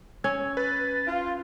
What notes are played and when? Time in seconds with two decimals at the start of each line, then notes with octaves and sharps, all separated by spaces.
0.24 C#4 E6 G#6
0.57 B4 A6
1.07 F4